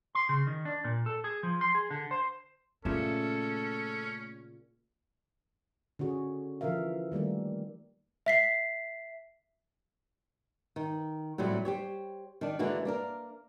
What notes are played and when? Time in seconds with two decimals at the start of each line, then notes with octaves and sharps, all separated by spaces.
0.15 C6
0.29 C#3
0.47 D#3
0.65 D4
0.84 A#2
1.06 A4
1.24 G#4
1.43 F3
1.61 C6
1.75 G#4
1.90 D3
2.11 C5
2.85 A#2 C#3 A3 A#3 C#4 A4 E5
5.99 D3 C#4 F#4 G#4
6.61 D3 E3 F3 A#4 E5 F5
7.12 D#3 G3 A3 A#3
8.26 E5 B6 C7
10.76 D#3
11.38 A2 C3 F#3 G3
11.65 G4 C5 C#5
12.41 D#3 D4
12.59 D3 E3 G#3 A#3 D4 F#4
12.85 A#3 D4 A#4